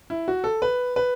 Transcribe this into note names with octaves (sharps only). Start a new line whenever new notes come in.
E4
F#4
A4
B4
B4